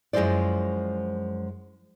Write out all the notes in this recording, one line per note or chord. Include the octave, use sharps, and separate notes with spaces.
F#2 F3 G#3 E4 C5 D5